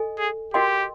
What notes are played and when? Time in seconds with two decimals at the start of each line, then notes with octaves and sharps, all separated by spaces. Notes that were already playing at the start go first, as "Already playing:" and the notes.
Already playing: A4 D#5 G#5
0.18 G#4
0.54 F#4 G4 A#4 D#5 G5 C6